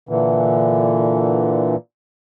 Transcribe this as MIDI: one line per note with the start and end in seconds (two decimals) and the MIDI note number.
0.09 1.76 46
0.09 1.76 50
0.09 1.76 52